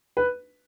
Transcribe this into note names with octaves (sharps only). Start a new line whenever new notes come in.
B4